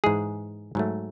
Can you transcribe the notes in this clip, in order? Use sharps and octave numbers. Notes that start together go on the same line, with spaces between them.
G#2 E3 G#3 G#4
G#2 F#3 A3